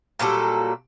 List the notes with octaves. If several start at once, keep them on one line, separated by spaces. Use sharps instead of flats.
A#2 F#3 G3 A4